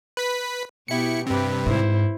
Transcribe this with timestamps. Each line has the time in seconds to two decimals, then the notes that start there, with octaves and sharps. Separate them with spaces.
0.17 B4 B6
0.88 B2 B3 E4 G4 C#7
1.27 G2 C3 C4 G4 B4
1.66 G#2 E4 C5